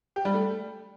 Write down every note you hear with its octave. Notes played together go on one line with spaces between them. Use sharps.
G4
G3
A3